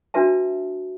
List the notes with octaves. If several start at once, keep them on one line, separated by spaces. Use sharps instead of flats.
D4 F#4 B4 E5 A5